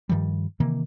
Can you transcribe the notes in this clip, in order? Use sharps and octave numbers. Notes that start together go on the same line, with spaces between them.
G2 D#3 F3 G3
C3 D#3 E3 A#3